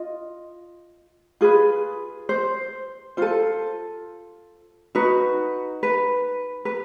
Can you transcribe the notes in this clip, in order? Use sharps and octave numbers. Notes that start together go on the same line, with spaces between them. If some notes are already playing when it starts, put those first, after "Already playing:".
Already playing: F4 D#5
F4 G#4 B4
C5
F4 A4 C5
D#4 F#4 B4
B4
B4